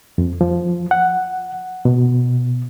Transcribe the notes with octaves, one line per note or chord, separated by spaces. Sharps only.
F2
F3
F#5
B2